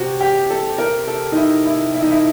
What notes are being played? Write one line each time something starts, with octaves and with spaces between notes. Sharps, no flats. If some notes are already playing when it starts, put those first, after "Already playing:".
Already playing: C3 F#4
G4
A4
A#4
A4
D#4
E4
E4
E4
D#4
E4